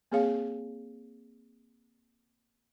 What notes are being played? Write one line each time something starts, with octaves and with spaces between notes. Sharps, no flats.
A#3 C4 G#4 C#5 F5